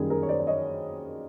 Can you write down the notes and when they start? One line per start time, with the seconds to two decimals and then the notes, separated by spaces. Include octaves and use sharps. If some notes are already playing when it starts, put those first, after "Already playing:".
Already playing: F#2 D#3 G3 A#3 G#4
0.10 G#4 A#4
0.23 C#5
0.29 C5 D5
0.39 D5
0.47 C#5 D#5